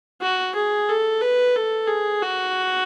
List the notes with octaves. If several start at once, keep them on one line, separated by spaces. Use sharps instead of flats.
F#4
G#4
A4
B4
A4
G#4
F#4